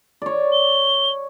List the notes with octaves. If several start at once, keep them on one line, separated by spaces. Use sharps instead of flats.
C#5 D5
G7